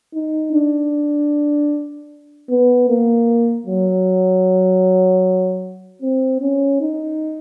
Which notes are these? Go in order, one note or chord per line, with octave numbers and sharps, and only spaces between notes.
D#4
D4
B3
A#3
F#3
C4
C#4
D#4